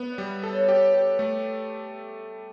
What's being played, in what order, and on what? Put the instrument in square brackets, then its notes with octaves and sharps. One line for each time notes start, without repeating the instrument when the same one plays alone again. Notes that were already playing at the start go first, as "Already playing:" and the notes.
Already playing: [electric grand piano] B3 [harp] E5 F#5
[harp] D5
[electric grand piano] G3
[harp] E5
[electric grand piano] A4
[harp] C#5
[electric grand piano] G4 [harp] B4
[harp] B4
[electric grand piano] G4
[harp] B4
[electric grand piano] A3